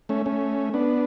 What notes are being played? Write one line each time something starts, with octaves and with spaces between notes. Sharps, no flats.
A3 C#4
A3 C#4
B3 D4